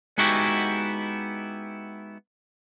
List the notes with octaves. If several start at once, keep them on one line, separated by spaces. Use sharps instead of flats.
G#3 B3 D#4 E4 F#4 G4